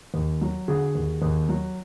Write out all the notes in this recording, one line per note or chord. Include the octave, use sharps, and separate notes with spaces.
D#2
F#3
D3 F#4 G#4
D#2
D#2
F#3